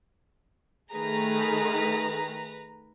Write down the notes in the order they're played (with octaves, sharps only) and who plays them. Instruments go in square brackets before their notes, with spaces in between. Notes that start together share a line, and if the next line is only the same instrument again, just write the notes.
[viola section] D#3 A3 G#4 [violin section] B4 A#5